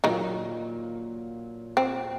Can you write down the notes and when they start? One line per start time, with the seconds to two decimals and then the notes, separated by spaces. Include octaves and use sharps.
0.04 A#2 D#3 F#3 A#3 D#4
1.77 C4